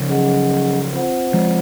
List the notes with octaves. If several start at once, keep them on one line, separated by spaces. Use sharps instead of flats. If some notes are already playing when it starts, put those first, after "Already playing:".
Already playing: C#3 F3
F#3 C#4 G#4 D#5 F#5
C4 F4 C5 F#5
F3 G#3